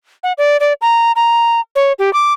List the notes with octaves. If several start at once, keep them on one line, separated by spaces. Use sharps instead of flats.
F#5
D5
D5
A#5
A#5
C#5
G4
D6